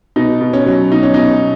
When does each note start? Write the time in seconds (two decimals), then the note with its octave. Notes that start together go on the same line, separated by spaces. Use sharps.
0.16 B2 D#4
0.41 B2
0.53 C#4
0.66 F#3
0.91 B2 D#4
1.03 C#4
1.14 B2 D#4